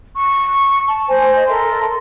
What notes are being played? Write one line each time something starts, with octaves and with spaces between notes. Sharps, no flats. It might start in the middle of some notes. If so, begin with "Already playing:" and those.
C#6
A5
C5 G#5
D#5
A4 A#4 E5 C6